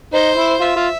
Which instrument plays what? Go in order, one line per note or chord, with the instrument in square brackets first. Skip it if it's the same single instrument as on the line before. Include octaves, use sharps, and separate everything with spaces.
[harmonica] D#4 [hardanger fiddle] C5
[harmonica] E4
[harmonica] F4 [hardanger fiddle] E5
[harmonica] F4